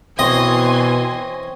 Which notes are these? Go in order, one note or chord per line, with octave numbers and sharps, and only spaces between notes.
B2 E3 C4 C#5 D#5 G#5 C6